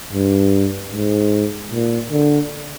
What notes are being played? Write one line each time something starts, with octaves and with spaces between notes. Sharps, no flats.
G2
G#2
A#2
D3